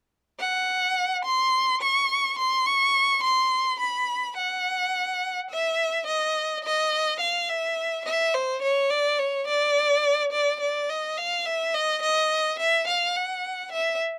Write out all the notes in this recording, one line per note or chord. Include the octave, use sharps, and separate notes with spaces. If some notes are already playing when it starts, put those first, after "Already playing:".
F#5
C6
C#6
C6
C#6
C6
B5
F#5
E5
D#5
D#5
F5
E5
E5
C5
C#5
D5
C#5
D5
D5
D5
D#5
F5
E5
D#5
D#5
E5
F5
F#5
E5